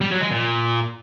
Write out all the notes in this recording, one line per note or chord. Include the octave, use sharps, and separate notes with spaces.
G3
F#3
G#3
A#2